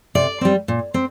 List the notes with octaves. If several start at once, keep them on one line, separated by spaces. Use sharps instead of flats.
C3 D5
G3 C4
A#2
C4